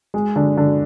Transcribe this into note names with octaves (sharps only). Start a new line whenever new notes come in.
G#3
D3
D3